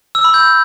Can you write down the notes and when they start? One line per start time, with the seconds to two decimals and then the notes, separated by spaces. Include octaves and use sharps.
0.15 E6
0.24 B5
0.34 G6